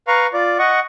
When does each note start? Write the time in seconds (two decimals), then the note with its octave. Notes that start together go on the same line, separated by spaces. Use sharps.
0.08 B4 F5 A#5 C#6
0.33 F4 D5
0.59 D#5 F#5 C#6